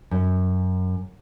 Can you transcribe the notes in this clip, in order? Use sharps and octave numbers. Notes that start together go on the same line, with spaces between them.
F#2